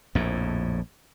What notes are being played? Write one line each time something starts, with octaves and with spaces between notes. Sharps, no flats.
A#1 F2 A2